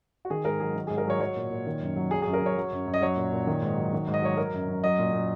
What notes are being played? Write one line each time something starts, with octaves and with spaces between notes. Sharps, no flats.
F#4
D#3 G#4
G#2 A#4
F#3 G#4
D#3
G#2 G#4
A#4
F#3 C#5
F#3 C#5
A#2
A#2
D#3
F#2
F#3
F#3 G#4
F#2 G#4
A#4
F#2 C#5
F#3
F#2
F#2
D#5
F#3 C#5
A#2
A#2
D#3
G#2
F#3
D#3
G#2
D#5
F#3 C#5
F#3 A#4
F#2
F#2
F#3 D#5
A#2
A#2